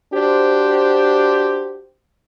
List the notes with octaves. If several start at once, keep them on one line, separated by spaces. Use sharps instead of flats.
D4 F#4 G4 C5